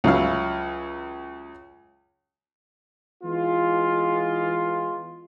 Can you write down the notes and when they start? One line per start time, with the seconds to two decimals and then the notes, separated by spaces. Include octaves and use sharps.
0.04 C#2 F#3 E4 F5 F6
3.23 E3 G#3 B3 F4